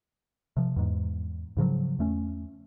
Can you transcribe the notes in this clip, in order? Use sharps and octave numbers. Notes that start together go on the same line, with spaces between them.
C3 F3
E2 G#2
G#2 C#3 F3 F#3
E2 A3 C#4